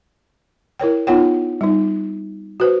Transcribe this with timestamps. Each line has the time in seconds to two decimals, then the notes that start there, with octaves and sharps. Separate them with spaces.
0.80 E4 A#4 C#5 G5
1.07 B3 D#4 F4 C#5 F#5 G5
1.61 G3 D#4
2.60 F#4 B4 C5